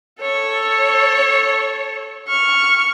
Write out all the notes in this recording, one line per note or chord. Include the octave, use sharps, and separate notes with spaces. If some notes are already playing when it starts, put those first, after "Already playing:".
A4 C#5
C#6 F6